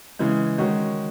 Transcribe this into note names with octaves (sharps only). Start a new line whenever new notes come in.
C#3 E3 G#3
D#3 G#3 C#4 F#4